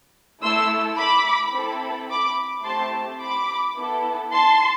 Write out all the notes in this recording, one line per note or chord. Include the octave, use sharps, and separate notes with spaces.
A3 E4 A4 C6 E6
B5 D6
C4 E4 A4
B5 D6
A3 C4 E4 G4 A5 C6
B5 D6
B3 E4 A4
A5 C6